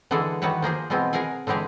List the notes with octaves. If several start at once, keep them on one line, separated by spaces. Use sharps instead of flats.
D3 E3 G#3 G#4 A4
D#3 E3 F#4 B4 C#5
F3 A#3 G#4 C5
B2 E3 G#3 B3 C4
G#4 A#4 F5 F#5 G#5
D3 E3 G#3 G4 G#4